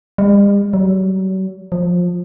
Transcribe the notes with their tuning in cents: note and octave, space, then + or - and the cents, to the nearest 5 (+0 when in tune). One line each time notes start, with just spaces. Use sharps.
G3 +45
F#3 +40
F3 +20